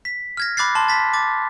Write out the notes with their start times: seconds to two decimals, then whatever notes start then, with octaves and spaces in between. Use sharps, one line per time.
0.05 B6
0.37 F6 G#6 A#6
0.57 B5 D6 F#6 A6 C7
0.75 A5 C6
0.88 A6 B6
1.13 D6 A6